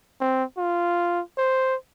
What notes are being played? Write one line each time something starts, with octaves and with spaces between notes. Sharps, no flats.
C4
F4
C5